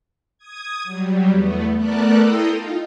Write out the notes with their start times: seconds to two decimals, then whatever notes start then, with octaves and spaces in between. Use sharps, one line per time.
0.38 D#6 G#6
0.84 F#3 G3
1.29 E2 A3 B3
1.77 A3 B3 A4 A#4 D5 F#6
2.19 E4 A4 G5 A#5 C6 D#6
2.51 D#4 F4